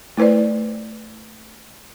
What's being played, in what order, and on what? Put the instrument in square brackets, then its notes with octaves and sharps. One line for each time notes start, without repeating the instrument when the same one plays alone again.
[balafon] A3 E4 B4 C5 D5